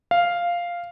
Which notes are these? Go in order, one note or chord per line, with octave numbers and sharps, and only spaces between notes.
F5